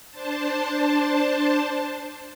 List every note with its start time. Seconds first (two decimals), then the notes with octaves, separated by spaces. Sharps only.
0.11 D4 C5 A5